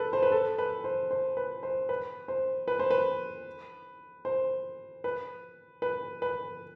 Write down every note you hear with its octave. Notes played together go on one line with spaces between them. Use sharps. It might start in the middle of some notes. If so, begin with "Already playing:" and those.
Already playing: A4 B4
C5
B4
A4
B4
C5
C5
B4
C5
B4
C5
B4
C5
B4
C5
B4
B4
B4